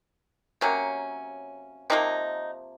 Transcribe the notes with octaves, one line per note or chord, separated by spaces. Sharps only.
C3 F#3 A#3 C#4
C3 F3 A#3 D#4